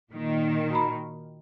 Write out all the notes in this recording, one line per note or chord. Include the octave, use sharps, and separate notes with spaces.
A#2 D#3
F#4 A#5 B5